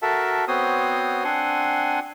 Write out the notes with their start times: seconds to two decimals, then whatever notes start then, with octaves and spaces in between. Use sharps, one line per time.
0.02 F#4 A4 A#4 E5 A5
0.48 B3 C4 F#4 C5 C#5 D#6
1.24 C4 D4 F#5 G#5 C6